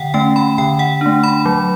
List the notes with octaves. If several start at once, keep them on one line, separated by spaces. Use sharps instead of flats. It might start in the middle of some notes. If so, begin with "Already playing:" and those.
Already playing: D3 F#5 G5
A3 C#4 G5
B5
D3 G5
F#5
A3 D4
B5
F#3